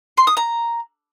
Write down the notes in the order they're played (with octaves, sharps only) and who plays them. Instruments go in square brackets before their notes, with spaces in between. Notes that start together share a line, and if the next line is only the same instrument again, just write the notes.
[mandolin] C6
D#6
A#5